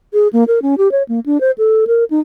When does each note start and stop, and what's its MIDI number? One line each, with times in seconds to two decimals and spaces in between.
0.14 0.28 68
0.33 0.44 58
0.48 0.59 70
0.62 0.75 61
0.78 0.91 67
0.92 1.03 73
1.09 1.20 58
1.26 1.40 62
1.41 1.51 72
1.58 1.85 69
1.87 2.04 70
2.10 2.20 63